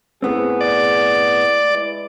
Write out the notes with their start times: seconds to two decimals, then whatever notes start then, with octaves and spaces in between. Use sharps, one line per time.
0.22 A2 B3 C4 G#4
0.61 D5
1.68 G#3 E4 B4